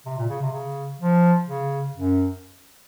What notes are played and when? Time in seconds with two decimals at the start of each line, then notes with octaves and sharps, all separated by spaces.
0.06 C3
0.18 A#2
0.29 C#3
0.42 C3
0.53 C#3
1.00 F3
1.47 C#3
1.94 F#2